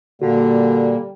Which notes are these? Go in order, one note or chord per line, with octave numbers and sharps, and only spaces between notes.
A#2 D3 G3 A#3 F#4